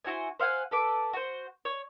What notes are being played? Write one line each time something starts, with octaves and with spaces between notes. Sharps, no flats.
E4 F#4 C5 G#5
C5 F5 F#5 G#5
A4 B4 D6
F#4 C5
C#5